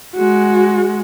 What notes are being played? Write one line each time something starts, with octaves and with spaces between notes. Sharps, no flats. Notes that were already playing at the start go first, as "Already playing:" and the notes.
G#3 F#4